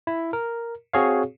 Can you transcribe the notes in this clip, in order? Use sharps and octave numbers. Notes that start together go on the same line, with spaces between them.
E4
A#4
C4 F#4 G#4 C#5 F5